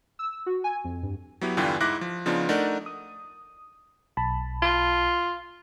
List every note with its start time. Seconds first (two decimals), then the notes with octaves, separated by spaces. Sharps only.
0.19 E6
0.46 F#4
0.64 G#5
0.84 F2
1.03 G2
1.41 F#3 B3 E4 G4
1.57 E2 G2 D3 E3 F4 G5
1.80 G#2 E4 D6 F#6 A#6
2.01 F3
2.26 C#3 F3 B3 D4 D#4 F4
2.49 A3 D4 D#4 A#4 D5 F#5
2.86 D#6
4.17 B1 A5 B5
4.62 F4